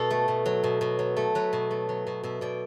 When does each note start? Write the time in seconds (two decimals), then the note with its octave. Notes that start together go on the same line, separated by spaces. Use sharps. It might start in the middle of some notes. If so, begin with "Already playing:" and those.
Already playing: B2 A4
0.10 A3
0.28 B2
0.46 F#3
0.64 B2
0.81 B2
0.99 F#3
1.17 A3
1.35 F#3 B4
1.53 B2
1.71 A3
1.89 F#3
2.07 B2
2.24 B2 E5
2.41 B2 D5